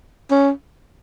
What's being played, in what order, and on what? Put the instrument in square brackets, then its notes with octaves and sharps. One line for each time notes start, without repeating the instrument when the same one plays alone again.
[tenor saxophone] C#4